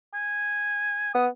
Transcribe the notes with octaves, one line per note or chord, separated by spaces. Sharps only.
G#5
B3 D#6